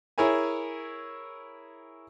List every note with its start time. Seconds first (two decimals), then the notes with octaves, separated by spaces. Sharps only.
0.18 E4 G#4 A#4 C#5 E5 G#5